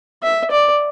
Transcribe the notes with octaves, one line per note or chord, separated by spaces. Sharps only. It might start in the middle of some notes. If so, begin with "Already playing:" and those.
E5
D5